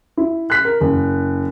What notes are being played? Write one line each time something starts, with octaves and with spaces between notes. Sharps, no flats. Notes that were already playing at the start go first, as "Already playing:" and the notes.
E4
F#6 B6
A#4
F#1